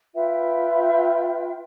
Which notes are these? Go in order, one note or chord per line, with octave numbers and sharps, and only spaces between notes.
F4 B4 E5 G5